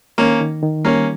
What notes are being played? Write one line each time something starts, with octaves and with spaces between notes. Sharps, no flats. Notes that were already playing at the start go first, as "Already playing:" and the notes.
D#3 A#3 C#4
D#3
D#3
G3 A#3 C#4